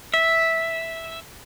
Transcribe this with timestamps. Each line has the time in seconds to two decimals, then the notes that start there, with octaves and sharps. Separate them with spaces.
0.14 E5